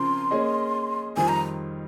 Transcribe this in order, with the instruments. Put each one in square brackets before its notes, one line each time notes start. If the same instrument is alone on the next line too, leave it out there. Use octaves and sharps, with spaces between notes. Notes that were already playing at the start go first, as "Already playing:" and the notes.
Already playing: [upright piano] C#3 F3 C4 A#4 [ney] C6
[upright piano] A#3 C#4 G#4 D#5
[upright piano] F2 D#3 G3 C4 F4 [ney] G#5
[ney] A#5